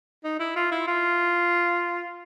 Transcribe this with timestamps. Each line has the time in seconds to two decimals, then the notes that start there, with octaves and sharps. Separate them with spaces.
0.24 D#4
0.40 E4
0.56 F4
0.72 E4
0.88 F4